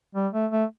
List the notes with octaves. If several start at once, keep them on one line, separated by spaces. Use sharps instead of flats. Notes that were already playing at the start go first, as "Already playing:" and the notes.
G3
A3
A3